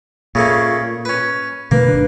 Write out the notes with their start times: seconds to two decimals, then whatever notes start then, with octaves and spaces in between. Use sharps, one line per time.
0.35 A#2 C#3 A3 A#3
1.05 C#4 B4
1.71 B2 D#3 A3 A#3 B4
1.88 G1 D4